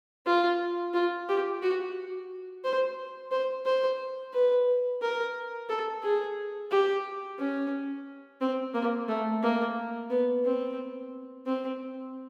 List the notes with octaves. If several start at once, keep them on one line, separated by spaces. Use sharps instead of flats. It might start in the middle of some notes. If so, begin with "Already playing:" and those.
F4
F4
G4
F#4
C5
C5
C5
B4
A#4
A4
G#4
G4
C#4
C4
A#3
A3
A#3
B3
C4
C4